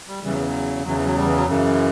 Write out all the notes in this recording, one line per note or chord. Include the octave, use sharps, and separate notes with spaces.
G3
E2 C#3 E3 G3
F#3
E3
F#3
E2 C#3 E3 F#3
E3
F#3
G3
E3
F#3
F#2 C#3 E3